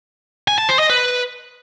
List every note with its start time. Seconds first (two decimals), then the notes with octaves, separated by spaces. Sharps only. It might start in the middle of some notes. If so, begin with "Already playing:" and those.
0.48 G#5
0.58 A5
0.69 C5
0.79 D#5
0.90 B4